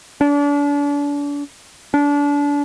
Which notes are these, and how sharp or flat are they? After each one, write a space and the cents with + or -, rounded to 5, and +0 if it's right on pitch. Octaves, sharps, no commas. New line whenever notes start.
D4 -35
D4 -30